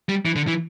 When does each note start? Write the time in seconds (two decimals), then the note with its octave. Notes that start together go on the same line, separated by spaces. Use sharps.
0.09 G3
0.26 E3
0.36 D3
0.48 E3